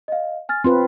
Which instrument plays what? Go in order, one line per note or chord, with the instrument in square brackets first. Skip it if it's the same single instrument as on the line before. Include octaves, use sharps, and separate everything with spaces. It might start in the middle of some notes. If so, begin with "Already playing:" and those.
[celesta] D#5 F5
G#5 F6 A6
[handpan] C4 F4 B4 [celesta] C6